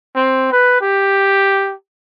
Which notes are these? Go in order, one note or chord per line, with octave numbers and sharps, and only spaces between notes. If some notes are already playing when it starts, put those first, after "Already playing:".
C4
B4
G4